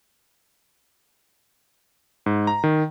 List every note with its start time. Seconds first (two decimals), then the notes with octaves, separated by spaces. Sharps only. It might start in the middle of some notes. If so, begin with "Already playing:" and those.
2.26 G#2
2.47 A#5
2.64 D#3